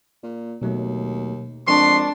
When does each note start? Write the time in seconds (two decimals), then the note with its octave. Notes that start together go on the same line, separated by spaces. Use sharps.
0.23 A#2
0.62 D#2 B2 F#3 A3
1.67 F2 G#3 D4 A#4 C6 C#6